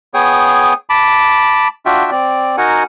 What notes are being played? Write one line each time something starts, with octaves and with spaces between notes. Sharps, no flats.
B3 G#4 C#5 G5 D#6
A5 B5 D6
D4 F4 F#4 E5 G5
C4 D5
D#4 F#4 A#4 F#5 G#5